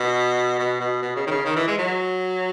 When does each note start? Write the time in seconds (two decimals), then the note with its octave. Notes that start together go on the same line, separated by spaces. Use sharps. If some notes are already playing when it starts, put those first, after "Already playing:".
Already playing: B2
0.59 B2
0.80 B2
1.02 B2
1.16 C#3
1.27 D#3
1.31 C#3
1.45 D#3
1.56 E3
1.67 G#3
1.78 F#3